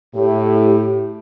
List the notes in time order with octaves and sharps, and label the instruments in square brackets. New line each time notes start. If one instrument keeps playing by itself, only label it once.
[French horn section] A2 [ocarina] G4